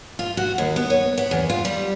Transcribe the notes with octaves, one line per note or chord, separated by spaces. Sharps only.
F4
F#4
D#2
B3
C#5
B3
E2
F4
G3